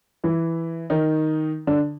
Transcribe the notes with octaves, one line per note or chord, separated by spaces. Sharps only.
E3 E4
D#3 D#4
D3 D4